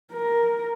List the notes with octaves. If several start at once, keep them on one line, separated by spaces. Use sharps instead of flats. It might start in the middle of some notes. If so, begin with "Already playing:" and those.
A#4